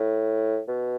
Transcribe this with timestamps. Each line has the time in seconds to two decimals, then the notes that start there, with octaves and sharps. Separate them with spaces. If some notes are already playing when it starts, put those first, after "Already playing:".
Already playing: A2
0.68 B2